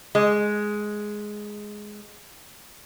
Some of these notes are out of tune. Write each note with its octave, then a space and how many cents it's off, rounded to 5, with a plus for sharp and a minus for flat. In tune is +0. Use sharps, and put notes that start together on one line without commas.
G#3 +5